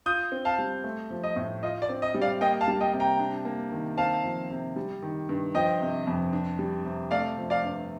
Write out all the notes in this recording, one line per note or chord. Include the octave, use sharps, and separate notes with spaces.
F4 D#6 G6
C4
F5 A5
G3
A3
F3
D#5
A2
F4 D#5
D5
C4
D#5
G3
D5 F5
A#3 D#5 G5
F5 A5
G3
D#5 G5
C3
G5 A#5
D4
A#3
D#3
C4 F5 A5
F3
C3
G3
D#3
G2
F3 D#5 G5
C3
F2
D4
G3
C3
A3 D5 F5
F3
D5 F5
G2